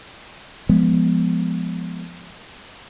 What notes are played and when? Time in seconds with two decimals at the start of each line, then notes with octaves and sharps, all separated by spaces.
0.69 F3 G#3 B3